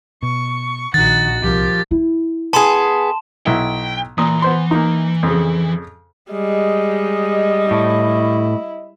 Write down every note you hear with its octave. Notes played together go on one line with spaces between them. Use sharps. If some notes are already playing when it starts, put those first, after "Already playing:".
B2 C#6
A#1 D#3 D#4 F#4 F#5 A6
C2 C3 F3 G4 A#4
E4
B3 G#4 A5 C6 E7
B1 E4 G5
A#2 E3 D#6
B3 C5 C6
A#3 D#4
F2 C#3
G3 G#3 D#5
A2 E4